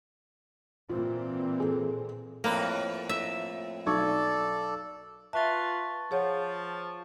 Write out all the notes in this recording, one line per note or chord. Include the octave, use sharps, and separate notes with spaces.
A#2 E3 C4 F4
G#4 A4
F2 A2 A#3 B4
E5
B1 A4 D5 C#6 G#6
F4 B4 E5 A5 C#6 A6
F3 G#4 C#5 F#5